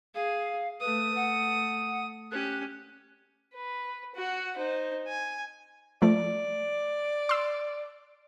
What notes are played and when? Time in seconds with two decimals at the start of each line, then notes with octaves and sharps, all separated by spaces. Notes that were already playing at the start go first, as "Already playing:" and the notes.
0.15 G#4 F5
0.80 A3 B4 D#6
1.15 F#5
2.31 C#4 G4 F#6
3.53 B4
4.15 F#4 F#5
4.57 D#4 C5
5.07 G#5
6.02 F3 A3 D5
7.29 C6 E6